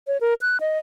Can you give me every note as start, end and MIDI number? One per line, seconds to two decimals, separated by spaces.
0.07 0.17 73
0.21 0.34 70
0.41 0.57 90
0.60 0.78 75